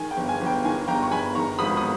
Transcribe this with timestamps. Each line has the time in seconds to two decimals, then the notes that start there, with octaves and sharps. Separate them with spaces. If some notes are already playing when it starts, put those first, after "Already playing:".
Already playing: D#3 G#5
0.11 G5
0.17 G1
0.29 G#5
0.41 G1
0.47 G5
0.65 D#3 G#5
0.88 G1 G5 A#5
1.03 C#6
1.12 G1 G#5 B5
1.35 D#3 A#5 C#6
1.59 G#1 B5 D#6
1.77 D#6